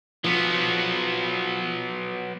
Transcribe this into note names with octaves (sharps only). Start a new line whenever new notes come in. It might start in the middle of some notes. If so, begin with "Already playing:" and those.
F3 F#3 B3